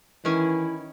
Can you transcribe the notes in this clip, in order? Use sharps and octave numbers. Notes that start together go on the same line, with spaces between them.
D#3 E3 C#4 E4 G#5